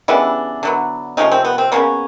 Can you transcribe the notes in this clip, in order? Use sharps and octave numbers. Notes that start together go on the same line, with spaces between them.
C#3 E3 G3 B3 D4 E4
D3 F#3 B3
C3 F3 A3 C#4 D#4
C4
B3
C4
C#3 F#3 A#3 B3 C#4